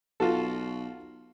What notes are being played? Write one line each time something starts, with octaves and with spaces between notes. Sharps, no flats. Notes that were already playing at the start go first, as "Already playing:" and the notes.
B1 F4 F#4 A4